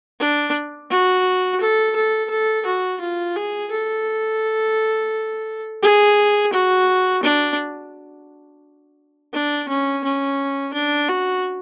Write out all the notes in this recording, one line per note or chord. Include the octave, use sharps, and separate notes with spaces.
D4
F#4
A4
A4
A4
F#4
F4
G#4
A4
G#4
F#4
D4
D4
C#4
C#4
D4
F#4